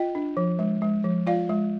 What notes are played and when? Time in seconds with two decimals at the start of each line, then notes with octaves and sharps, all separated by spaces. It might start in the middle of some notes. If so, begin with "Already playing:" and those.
Already playing: F4 D#5 G5
0.15 D4
0.37 F3
0.59 G#3
0.82 G#3
1.04 F3
1.27 F4 D5 F5
1.49 G#3